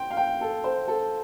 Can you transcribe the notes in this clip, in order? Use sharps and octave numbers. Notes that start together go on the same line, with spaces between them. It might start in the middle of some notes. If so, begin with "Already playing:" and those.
Already playing: G5 C6
F5
G5
A4
C5
A4